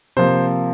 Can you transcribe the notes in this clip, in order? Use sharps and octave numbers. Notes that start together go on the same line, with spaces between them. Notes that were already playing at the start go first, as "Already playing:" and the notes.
C3 F3 A#3 C5